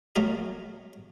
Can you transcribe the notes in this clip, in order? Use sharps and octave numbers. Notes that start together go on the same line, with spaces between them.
F#3 A3 F#4 A#4 D#5